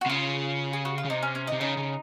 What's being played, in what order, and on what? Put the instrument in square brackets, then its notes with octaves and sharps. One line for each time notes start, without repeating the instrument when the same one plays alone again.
[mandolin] F#4
[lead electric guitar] C3
[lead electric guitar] C#3 [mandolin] F4
[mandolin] G#4
F#4
F4
[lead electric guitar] C#3
[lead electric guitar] C3 [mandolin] D#4
[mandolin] C#4
C#4
D#4
[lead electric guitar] C3
[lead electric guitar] C#3 [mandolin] D#4
[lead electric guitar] C#3